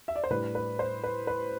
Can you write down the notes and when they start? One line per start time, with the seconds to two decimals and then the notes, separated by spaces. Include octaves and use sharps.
0.08 E5
0.16 D5
0.24 C5
0.30 A2 G3 D4 B4
0.55 B4
0.79 C5
1.04 B4
1.27 B4